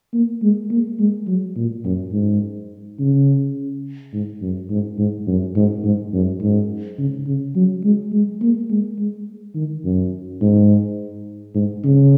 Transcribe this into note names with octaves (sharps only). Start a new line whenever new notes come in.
A#3
G#3
A#3
G#3
F#3
A#2
F#2
G#2
C#3
G#2
F#2
G#2
G#2
F#2
G#2
G#2
F#2
G#2
C#3
C#3
F#3
G#3
G#3
A#3
G#3
G#3
D#3
F#2
G#2
G#2
C#3